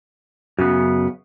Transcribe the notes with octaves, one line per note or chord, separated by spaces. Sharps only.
F#2 C#3 B3 F#4